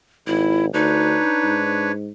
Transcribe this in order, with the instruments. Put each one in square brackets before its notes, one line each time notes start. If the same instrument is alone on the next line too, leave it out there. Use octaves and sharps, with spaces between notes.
[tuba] G#1 [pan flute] E4
[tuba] D2 [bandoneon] D4 B4 C#5 [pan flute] D#4
[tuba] G#2